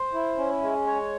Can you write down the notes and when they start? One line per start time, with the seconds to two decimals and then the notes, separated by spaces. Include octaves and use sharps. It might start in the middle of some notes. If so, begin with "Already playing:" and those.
Already playing: C5
0.14 E4
0.38 C#4
0.62 G#3
0.86 C#5